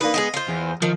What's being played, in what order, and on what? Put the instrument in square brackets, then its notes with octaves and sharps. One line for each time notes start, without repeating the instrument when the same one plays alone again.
[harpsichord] A#3 D4 D#4 [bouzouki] B4
[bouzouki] G#3 A#3 B3 [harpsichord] D#5
[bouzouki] F4 C5
[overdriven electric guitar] E2
[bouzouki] D#3 [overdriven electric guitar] F3